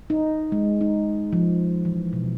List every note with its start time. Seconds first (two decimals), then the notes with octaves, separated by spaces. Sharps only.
0.10 D#4
0.52 G#3
0.81 D#4
1.33 F3
1.85 E3
2.13 B2